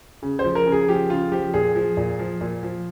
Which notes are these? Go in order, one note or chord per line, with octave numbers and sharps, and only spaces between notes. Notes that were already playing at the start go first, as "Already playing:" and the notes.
C#3
C5
F3
A#4
C#3
G#4
F3 G4
C#3 F4
F3 G4
A#2 G#4
F3
A#2
F3
A#2
F3